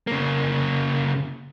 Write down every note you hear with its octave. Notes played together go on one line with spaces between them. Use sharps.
C#3 A#3